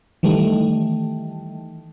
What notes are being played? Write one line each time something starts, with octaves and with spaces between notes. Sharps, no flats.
D#3 E3 G3 A3